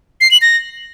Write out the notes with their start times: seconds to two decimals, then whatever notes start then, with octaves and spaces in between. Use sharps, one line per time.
0.21 C7
0.31 F#7
0.42 A#6